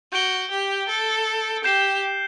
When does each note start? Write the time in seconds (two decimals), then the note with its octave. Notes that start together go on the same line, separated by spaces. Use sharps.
0.13 F#4 G6 D7 G7
0.51 G4
0.89 A4
1.64 G4 G6 C7 E7 G7